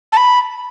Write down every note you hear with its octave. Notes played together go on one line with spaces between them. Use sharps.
A5
B5